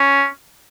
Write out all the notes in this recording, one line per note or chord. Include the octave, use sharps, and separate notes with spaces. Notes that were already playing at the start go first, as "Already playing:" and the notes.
Already playing: C#4